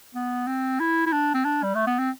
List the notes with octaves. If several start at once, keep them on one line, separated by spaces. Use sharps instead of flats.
B3
C4
E4
E4
D4
C4
D4
G3
A3
B3
C4